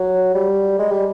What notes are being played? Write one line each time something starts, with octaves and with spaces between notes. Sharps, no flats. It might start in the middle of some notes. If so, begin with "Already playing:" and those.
Already playing: F#3
G3
G#3
G3